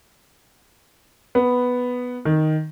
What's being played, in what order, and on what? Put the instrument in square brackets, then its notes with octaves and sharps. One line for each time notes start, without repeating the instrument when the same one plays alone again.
[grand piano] B3
D#3